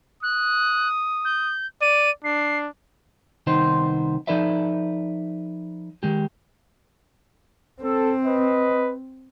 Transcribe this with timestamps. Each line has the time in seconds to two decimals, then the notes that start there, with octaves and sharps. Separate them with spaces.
0.23 D#6 F#6
1.25 G6
1.82 D5 D#7
2.24 D4 C7
3.47 C2 D#3 B3 D#4 C5 C6
4.27 F3 D#4 A4 B4 D5 E5
6.03 D#3 G#3 G4
7.82 C4 A4
8.25 B4 D#5